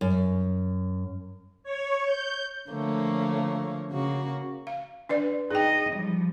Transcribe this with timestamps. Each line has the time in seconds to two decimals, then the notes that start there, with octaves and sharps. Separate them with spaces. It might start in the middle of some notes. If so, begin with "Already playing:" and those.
0.01 F#2
1.63 C#5
2.05 G6
2.69 D3 F3 A3 A#3 C#5
3.91 C#3 A#3 F#4
4.67 F5
5.09 D4 B4 D5
5.51 D#4 G#4 D#5 G5
5.93 F3 G3